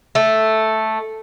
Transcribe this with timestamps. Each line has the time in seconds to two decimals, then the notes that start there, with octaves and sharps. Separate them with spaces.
0.15 A3